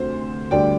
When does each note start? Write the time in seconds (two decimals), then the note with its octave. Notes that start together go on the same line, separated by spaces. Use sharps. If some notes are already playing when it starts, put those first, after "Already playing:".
Already playing: D2 C3 C5
0.51 D2 D3 G3 D4 D5 G5